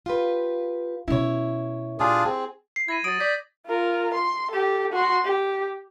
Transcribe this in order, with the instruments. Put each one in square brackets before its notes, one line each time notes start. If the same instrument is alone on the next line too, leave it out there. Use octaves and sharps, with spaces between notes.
[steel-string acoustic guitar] F4 G4 B4
[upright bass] B2 C#4 [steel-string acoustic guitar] E4 C#5
[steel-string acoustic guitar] A#2 G4 [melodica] D4 F4 G#4
[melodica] C4 [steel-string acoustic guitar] G#4
[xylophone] C7
[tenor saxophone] E4 [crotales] G#6 A#6 D#7
[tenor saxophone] F#3 [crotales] D#6 A6 [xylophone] D7
[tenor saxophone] D5 [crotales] G6 A#6 B6
[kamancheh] F4 A#4
C6
G4 A4
F#4 C6
G4